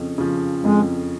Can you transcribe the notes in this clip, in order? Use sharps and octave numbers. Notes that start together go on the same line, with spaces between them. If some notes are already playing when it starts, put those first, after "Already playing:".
Already playing: F2 C#3 F3
C#3 F3
F2 G#3